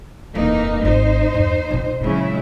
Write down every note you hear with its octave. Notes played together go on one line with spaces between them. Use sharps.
D#1 F2 E3 A#3 D#4
G#1 D#4 C5
E2 G2
A#1 C#3
A#2 C#3 F#3 G#3 E4